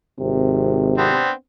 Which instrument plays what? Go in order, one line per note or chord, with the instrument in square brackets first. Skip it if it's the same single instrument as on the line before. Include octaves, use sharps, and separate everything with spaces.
[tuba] G#1 [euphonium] C3
[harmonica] B3 C4 D4